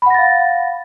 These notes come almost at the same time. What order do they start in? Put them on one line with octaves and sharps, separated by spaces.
B5 F#5 A#6 A6 F5